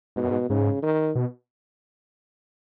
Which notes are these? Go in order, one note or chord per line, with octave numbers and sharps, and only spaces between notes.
G#2 B2
F#2
G#2
G#2 C#3
D#3
B2